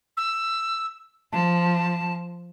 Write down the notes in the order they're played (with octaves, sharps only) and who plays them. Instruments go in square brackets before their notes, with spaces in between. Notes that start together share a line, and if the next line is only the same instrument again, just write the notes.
[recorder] E6
[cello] F3 [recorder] A5